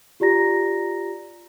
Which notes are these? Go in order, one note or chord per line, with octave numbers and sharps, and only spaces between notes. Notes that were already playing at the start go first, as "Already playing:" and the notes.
F4 G4 D5 A#5 A#6